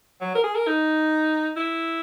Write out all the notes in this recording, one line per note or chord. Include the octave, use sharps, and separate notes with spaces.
F#3
A#4
G#4
A#4
D#4
E4